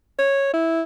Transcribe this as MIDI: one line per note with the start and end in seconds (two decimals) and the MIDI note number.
0.19 0.49 73
0.53 0.82 64